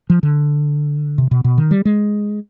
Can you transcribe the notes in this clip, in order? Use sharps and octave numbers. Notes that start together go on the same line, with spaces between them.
F3
D3
C3
B2
B2
D#3
G3
G#3